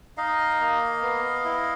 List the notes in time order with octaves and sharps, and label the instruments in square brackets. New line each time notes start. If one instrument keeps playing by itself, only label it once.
[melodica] D#4 D#5 F5
A#3
B3
E4